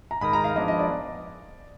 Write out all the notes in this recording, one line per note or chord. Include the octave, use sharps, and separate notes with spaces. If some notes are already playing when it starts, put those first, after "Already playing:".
A#5
G#2 D#3 G#3 D#4 A#4 B5
A#5
F5
F3 G#3 B3 D4 D#5
D#5
D5